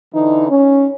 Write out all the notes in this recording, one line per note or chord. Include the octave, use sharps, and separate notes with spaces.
D3 E3 D#4
C#4